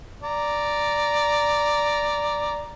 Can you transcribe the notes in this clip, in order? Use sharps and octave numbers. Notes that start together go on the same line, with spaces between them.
D5 A#5